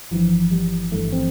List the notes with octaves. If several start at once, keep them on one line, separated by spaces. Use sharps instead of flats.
G1 G2 E3 F3
G3
G1 G2 E3 A3
C4